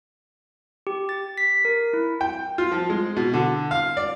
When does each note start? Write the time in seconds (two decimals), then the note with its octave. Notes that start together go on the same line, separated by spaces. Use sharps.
0.87 G4
1.09 A6
1.38 B6
1.65 A#4
1.93 E4
2.21 G5
2.58 F4
2.72 F3
2.90 G#3
3.17 B2
3.34 D3
3.71 F5
3.97 D5